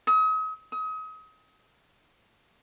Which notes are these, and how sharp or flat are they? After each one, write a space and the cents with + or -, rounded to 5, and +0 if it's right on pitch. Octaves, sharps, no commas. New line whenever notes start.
D#6 +40
D#6 +35